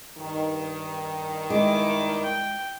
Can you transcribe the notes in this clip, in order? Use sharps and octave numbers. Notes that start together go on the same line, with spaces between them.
G2 D#3
G#3 E4 D6
G5